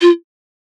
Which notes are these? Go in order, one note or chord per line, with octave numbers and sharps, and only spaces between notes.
F4